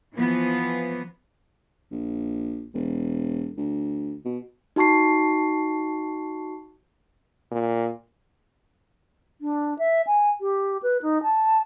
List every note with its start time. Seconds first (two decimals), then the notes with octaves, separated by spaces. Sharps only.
0.15 E3 F3 B3
1.91 A#1
2.74 E1
3.57 D2
4.25 B2
4.76 D#4 F#4 A5 C#6 C7
7.51 A#2
9.41 D4
9.79 E5
10.07 G#5
10.41 G4
10.83 B4
11.02 D#4
11.23 A5